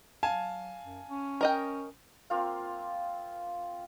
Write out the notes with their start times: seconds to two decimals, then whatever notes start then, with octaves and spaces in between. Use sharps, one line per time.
0.23 F#3 F5 G#5 A5
0.83 F#2
1.10 C#4
1.41 A#4 D#5 G5
2.30 A#3 C4 F4 F5